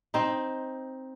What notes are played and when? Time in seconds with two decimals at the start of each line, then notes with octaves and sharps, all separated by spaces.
0.14 C4 D#4